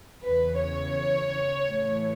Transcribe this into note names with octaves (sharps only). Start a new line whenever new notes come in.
E2 C#3 E3 B4
C#5
A2 E3 A3